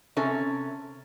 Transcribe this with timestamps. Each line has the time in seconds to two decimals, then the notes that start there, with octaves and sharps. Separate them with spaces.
0.17 C3 C#4 A4